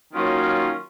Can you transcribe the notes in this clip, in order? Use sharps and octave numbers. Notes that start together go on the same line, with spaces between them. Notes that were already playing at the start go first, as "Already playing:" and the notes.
D#3 F#3 A#3 C#4 F4